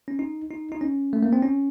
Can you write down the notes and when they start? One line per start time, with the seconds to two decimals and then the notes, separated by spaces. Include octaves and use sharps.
0.08 C#4
0.19 D#4
0.51 D#4
0.72 D#4
0.81 C#4
1.13 A3
1.23 A#3
1.33 C4
1.42 C#4